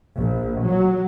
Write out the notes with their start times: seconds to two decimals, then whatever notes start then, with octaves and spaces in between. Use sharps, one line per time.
0.17 A#1
0.65 F#3